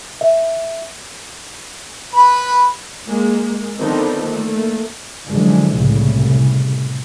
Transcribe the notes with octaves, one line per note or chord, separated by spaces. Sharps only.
E5
B4 B5
G#3 A#3
D3 D#3 F3 B3 C4 D#4
A3 A#3
F#2 D3 E3 F3 G#3
C2 A2 C#3